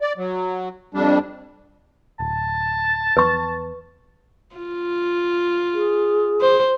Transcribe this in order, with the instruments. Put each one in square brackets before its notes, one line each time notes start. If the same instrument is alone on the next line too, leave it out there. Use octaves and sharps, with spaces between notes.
[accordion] D5
F#3
F2 G3 D4
[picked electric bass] D1 [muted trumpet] A5
[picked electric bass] E2 [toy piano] B4 C#6
[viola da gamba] F4
[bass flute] G#4
[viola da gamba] C5